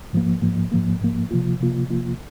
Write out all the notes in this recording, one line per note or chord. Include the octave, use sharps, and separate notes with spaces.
G#2 F3 A#3
G#2 F3 A#3
G#2 F3 A#3
G#2 F3 A#3
C3 F3 A#3 F4
C3 F3 A#3 F4
C3 F3 A#3 F4